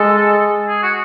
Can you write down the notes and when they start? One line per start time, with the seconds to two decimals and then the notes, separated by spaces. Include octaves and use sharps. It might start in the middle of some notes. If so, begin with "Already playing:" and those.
Already playing: G#3 A4
0.68 G#4
0.83 F#4